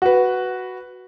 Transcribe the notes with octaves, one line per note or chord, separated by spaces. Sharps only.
F#4 B4